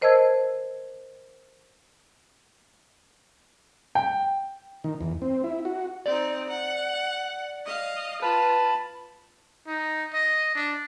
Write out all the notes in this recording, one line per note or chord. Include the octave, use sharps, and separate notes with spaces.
A#4 C5 D#5 A5 E6 G#6
G5
D#3
E2
C4
E4
F#4
C4 D#4 D5
F#5
D#5 F5
F4 B4 A5 B5
D#4
D#5
D4